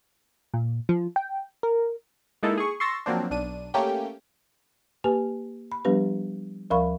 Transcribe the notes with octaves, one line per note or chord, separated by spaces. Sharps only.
A#2
F3
G5
A#4
G#3 A#3 D#4 E4 A4
G#4 C#6
C6 C#6 E6 A6 A#6
F3 F#3 A#3 C4 D4
B1 D4 D#7
A3 A#3 C#4 G4 G5
A#3 G4 B4 G#5
B5
F3 G3 B3 D4 G4 B4
D2 F3 A#4 F5 B5 C#6